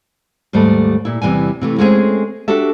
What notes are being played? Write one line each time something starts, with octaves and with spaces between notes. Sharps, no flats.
D#2 G#2 G3 A3
A#2 E4
E2 C3 E3 G3 G#5
C3 E3 A3
G#3 A3 C4 C#4 F#4 G#4
D4 F#4 G4 A4 E5